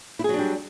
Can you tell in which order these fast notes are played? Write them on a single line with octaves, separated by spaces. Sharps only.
E4 G#4 F#3 D4 G3